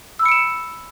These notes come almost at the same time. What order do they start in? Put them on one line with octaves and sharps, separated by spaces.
E6 B5 C#7 D7 E7